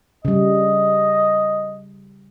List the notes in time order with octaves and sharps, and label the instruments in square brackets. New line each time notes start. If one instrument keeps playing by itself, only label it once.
[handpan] C#3 G3 [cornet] D#5